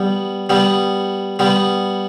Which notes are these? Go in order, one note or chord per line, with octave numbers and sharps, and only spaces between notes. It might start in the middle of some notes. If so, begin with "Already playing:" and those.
Already playing: G3 B3
G3 B3
G3 B3